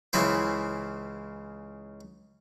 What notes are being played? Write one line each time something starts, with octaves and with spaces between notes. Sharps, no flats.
C#2 C#3 E3 E4 C5